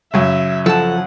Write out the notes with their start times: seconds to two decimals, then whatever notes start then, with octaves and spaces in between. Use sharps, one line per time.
0.14 F#2 C#3 E5
0.66 F3 A4 F#5 A5